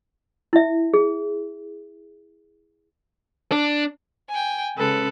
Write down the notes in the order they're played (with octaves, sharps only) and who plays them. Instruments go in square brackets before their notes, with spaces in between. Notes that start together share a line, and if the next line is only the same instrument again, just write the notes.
[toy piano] E4 E5
G#4
[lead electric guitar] D4
[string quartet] G5 G#5
[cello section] C#3 [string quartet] G#3 [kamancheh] A4 B4